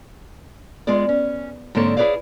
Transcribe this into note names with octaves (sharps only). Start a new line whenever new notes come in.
G#3 B3 F4 G#4 D5
C#4
G#2 D3 A#3 C4 A4 C#5
E4 G#4 B4 C#5 D5 F5